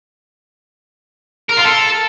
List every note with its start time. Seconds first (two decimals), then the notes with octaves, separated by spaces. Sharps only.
1.49 A#4
1.57 F4
1.64 A4